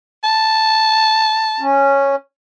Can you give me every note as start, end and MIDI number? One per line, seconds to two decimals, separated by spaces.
0.24 1.63 81
1.60 2.15 61